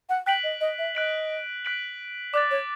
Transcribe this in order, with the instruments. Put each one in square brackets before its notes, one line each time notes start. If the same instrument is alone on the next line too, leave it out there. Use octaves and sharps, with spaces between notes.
[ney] F#5
[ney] G5 [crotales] F#6 B6 D7 F#7
[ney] D#5
D#5
E5
[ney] D#5 [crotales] F#6 B6 D7 F#7
[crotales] F#6 B6 D7 F#7
[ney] D5 [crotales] D6 F#6 A6
[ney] C#5